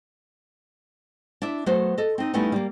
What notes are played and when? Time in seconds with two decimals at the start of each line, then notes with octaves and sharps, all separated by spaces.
1.42 D4 E4 E5
1.66 F#3 A3 B3 F#4 C5 C#5
1.98 A4 D#5
2.18 C4 D#4
2.34 G3 A3 B3 C#4 D#4 E4
2.52 G3 A#3